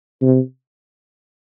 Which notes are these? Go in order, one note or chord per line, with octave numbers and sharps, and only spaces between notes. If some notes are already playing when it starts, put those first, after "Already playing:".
C3